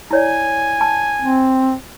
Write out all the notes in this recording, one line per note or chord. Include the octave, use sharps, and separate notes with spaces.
E4 C#5 D5 G#5
A5
C4